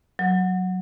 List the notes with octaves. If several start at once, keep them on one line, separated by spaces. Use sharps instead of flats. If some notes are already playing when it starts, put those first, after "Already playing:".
F#3